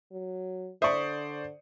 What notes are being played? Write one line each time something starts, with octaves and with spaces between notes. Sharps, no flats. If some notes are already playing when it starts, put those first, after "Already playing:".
F#3
D3 C5 D5 E5 C#6 D#6